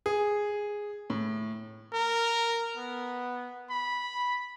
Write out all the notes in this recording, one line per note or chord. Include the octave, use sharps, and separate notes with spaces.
G#4
A2
A#4
B3
B5